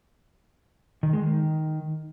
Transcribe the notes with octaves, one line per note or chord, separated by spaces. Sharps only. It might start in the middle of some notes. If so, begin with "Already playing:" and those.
D#3
G#3
D#3